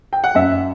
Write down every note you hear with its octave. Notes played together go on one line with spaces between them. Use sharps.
G5
F#5
F#2 E5